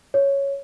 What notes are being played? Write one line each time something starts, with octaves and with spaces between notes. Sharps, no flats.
C#5